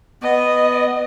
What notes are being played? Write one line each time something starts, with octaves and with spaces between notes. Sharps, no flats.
B3 D#5